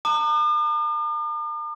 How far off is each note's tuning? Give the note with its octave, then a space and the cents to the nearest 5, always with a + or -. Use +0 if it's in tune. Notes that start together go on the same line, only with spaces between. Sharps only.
A#5 -40 D6 +45